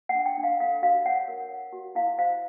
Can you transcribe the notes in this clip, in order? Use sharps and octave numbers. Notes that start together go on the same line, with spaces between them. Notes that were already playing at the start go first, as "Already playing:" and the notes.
F#5
D4
G5
D4
F5
A4 F5
F#4 F5
C#5 F#5
A#4
C#5
F#4
E4 F5
C5 F5